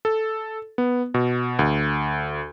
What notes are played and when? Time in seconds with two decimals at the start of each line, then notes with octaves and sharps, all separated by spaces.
0.05 A4
0.78 B3
1.14 B2
1.59 D2